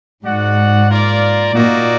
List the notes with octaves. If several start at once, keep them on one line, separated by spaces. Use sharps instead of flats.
G#2 F#4 D5 F#5
A#3 F4 A#4 D5
A#2 A#3 D#4 F#4 D5